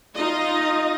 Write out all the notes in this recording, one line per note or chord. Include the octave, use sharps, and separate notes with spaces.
D#4 F4 D#5